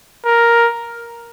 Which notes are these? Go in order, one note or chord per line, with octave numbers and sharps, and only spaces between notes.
A#4